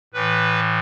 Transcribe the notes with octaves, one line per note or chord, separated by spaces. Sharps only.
A2 E3 B4